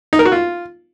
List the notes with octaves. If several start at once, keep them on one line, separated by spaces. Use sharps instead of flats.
D#4
A#4
F#4
F4